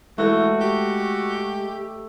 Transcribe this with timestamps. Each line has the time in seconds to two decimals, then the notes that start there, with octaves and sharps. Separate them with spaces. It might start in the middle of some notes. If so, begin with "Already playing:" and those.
0.18 E3 G#3 A3 F#4
0.61 G4